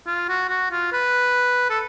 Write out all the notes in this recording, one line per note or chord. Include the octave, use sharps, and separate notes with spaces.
F4
F#4
F#4
F4
B4
A4